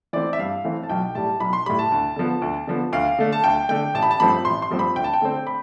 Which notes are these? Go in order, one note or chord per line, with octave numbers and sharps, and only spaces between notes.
E3 A3 C4 D5
E5
G2 F5
E3 A3 C4
A5
B1 G5
A2 G3 A5
B1 B5
C6
A2 G3 B5
A5
D2
D3 F3 B3
D2
D3 F3 B3
D2 F5
D3 A3
A5
D2 G5
D3 A3 G5
A1 A5
B5
A5
G2 F3 A3 C4 B5
A1 C6
C6
G2 F3 A3 C4
B5
D2 G5
A5
G5
D3 A3 C4
B5